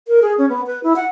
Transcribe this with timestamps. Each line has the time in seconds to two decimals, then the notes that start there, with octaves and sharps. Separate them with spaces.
0.08 A#4
0.22 G#4
0.38 C#4
0.50 B3
0.67 B4
0.83 E4
0.96 F#5